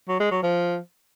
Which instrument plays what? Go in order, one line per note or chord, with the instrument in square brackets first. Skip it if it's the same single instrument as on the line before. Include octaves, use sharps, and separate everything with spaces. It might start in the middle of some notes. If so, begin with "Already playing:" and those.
[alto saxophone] F#3
G#3
F#3
F3